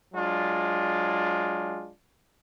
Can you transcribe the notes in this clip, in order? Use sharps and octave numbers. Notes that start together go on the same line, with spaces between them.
F#3 G#3 D4 F4